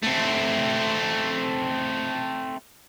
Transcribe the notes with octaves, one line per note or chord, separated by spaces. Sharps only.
A3 C4